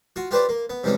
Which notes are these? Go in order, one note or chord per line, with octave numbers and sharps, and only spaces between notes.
F4 F#4
F4 G4 B4 C5 D5
A#3
B3
C3 E3 G3 G#3 C#4